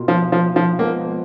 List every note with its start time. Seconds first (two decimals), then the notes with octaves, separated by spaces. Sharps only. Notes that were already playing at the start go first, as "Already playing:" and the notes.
Already playing: B2 A#3 F4
0.08 F3
0.32 F3
0.56 F3
0.79 F3 G#3 A#3 B3